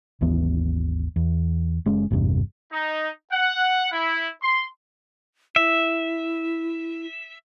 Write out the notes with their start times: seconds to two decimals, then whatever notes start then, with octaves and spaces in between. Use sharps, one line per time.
0.21 G#1 D#2 E3 B3
1.16 E2
1.86 F#1 G#3 C#4
2.10 G#1 E2 G2 C3
2.71 D#4
3.31 F#5
3.90 E4
4.41 C6
5.56 E4 E5